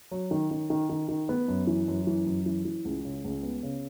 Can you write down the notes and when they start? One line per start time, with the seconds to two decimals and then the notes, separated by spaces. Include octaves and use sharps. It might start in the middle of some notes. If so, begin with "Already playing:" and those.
0.11 F#3
0.31 D#3
0.51 D#3
0.70 D#3
0.90 D#3
1.09 D#3
1.29 B3
1.48 F#2
1.67 E3
1.88 F#2
2.07 E3
2.26 F#2
2.46 E3
2.65 E3
2.85 C#2
3.05 C#3
3.24 C#2
3.43 B3
3.63 C#3